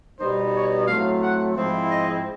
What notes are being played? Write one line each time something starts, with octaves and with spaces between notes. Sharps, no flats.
B2 G3 B3 D#4 C5
C#5
A2 F#3 A3 C4 F5
F#5
G#2 F3 G#3 C4 E4
D#5